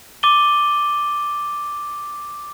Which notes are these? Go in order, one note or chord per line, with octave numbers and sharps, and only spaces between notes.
D6 A6 D#7 G7